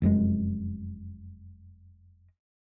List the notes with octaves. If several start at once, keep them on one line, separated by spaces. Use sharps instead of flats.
F1 F#2 A2 G#3